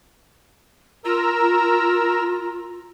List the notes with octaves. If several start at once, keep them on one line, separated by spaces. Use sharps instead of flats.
F4 A#4 A#5 E6